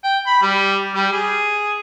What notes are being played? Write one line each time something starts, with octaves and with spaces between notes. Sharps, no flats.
G5
B5
G3
G3
G#4